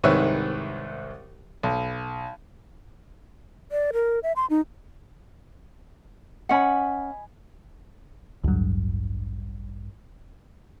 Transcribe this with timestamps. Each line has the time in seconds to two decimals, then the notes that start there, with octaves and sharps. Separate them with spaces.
0.04 C2 G#2 D#3 B4 C#5 E5
1.63 B1
3.72 D5
3.93 A#4
4.23 E5
4.36 C6
4.50 D#4
6.49 C#4 D#5 F#5 G#5 B5
8.44 A1 D2 G2 F#3